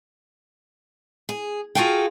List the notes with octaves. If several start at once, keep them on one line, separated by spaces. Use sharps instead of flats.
G#4
F4 F#4 G#4 A4 F5 G5